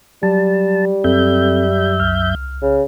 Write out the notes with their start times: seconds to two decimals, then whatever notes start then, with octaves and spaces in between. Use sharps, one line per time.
0.23 F#3 G3 A5
1.04 F#2 C4 A4 E5 G6
2.00 C2 F6
2.62 C#3